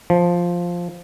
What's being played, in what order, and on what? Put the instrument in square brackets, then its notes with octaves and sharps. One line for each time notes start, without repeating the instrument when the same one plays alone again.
[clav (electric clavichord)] F3